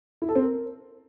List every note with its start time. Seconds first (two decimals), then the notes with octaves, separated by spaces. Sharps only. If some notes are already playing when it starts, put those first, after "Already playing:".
0.22 E4
0.29 A4
0.35 C4
0.42 A#4